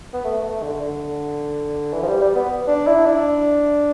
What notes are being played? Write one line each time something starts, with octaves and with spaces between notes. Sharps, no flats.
B3
A3
A3
D3
D3
E3
F3
G3
G3
B3
D4
E4
D4